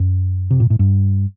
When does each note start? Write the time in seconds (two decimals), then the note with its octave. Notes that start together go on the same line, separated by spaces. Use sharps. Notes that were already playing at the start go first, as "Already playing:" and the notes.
Already playing: F#2
0.51 C3
0.60 A#2
0.70 A2
0.79 G2